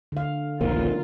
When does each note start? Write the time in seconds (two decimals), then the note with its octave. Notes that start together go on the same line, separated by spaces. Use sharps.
0.12 D3 F5
0.61 F1 A#1 D#2 F4 A#4